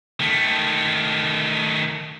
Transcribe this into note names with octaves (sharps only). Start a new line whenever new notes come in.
D#3 A3